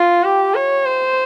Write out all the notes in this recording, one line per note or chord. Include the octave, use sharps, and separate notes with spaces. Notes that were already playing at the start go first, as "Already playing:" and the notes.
Already playing: F4
G4
C#5
C5